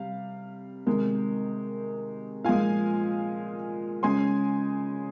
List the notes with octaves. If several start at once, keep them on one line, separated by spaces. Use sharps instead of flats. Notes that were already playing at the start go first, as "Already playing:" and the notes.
Already playing: C3 G3 F5
C3 D#3 G#3
A#2 F3 G#3 F5 G#5
C#3 G#3 G#5 C6